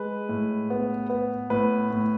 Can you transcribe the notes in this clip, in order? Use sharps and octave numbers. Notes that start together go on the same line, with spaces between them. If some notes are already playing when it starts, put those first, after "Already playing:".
Already playing: G#3 B4
A2
B3
B3
A2 B4
A2